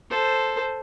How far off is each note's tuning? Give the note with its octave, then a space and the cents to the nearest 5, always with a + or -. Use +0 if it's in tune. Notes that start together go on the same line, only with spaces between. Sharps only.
A4 +0 C5 +0